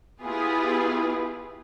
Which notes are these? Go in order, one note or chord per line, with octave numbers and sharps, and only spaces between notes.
B3 E4 F4 G4 G#4 B4